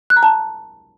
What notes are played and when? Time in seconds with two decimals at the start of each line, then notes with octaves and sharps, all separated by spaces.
0.10 F#6
0.16 A#5
0.23 A5